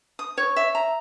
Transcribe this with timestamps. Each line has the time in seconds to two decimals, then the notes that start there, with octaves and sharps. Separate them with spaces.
0.19 D#6
0.38 C#5
0.56 E5
0.75 A#5